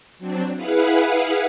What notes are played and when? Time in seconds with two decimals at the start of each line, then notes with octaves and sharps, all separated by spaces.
0.18 F#3 C4 D4
0.55 E4 G#4 B4 F5 F#5